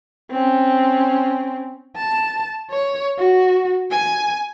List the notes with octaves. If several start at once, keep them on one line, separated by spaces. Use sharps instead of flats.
C4 C#4
A5
C#5
F#4
G#5